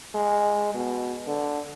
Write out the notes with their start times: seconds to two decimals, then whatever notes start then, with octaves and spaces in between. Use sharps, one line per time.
0.15 G#3
0.74 B2
1.27 D3